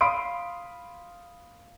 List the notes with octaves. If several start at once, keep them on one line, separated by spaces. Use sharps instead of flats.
F5 B5 C6 D#6 D7